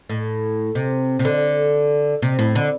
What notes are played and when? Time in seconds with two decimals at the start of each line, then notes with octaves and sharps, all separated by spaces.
0.09 A2
0.75 C3
1.19 C3
1.25 D3
2.22 C3
2.39 A2
2.55 D3